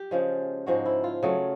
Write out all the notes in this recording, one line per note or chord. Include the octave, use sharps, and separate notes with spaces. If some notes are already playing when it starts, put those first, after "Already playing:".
Already playing: G4
C#3 F3 G#3
G#2 F3 G#3 F#4
E4
F4
C#3 F#3 A3